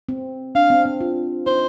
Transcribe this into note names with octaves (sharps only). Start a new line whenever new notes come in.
C4
D4 F5
C4
C4
F4
D#4 C5